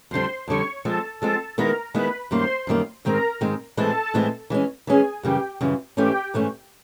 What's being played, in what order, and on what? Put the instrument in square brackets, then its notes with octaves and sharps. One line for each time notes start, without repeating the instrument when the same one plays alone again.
[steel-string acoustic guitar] F2 D3 G3 [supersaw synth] C5 C6
[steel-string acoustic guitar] F2 D3 G3 [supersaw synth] C#5 C#6
[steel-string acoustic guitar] F3 G#3 C4 [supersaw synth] A4 A5
[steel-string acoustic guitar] F3 G#3 C4 [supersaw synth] A4 A5
[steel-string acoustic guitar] D#3 G#3 B3 E4 [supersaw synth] A#4 A#5
[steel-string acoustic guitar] D#3 G#3 B3 E4 [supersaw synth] B4 B5
[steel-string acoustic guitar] F#2 D#3 G3 A#3 [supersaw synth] C5 C6
[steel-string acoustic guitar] F#2 D#3 G3 A#3
[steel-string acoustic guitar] G#2 D#3 G#3 C4 [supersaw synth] A#4 A#5
[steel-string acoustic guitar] G#2 D#3 G#3 C4
[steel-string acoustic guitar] A2 E3 G#3 C4 E4 [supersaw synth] A4 A5
[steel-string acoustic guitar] A2 E3 G#3 C4 E4
E3 G#3 C#4
[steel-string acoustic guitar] E3 G#3 C#4 [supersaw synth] G#4 G#5
[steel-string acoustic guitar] F#2 C#3 E3 G3 [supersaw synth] G4 G5
[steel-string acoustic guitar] F#2 C#3 E3 G3
[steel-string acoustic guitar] G#2 E3 A3 C#4 [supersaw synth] G4 G5
[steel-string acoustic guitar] G#2 E3 A3 C#4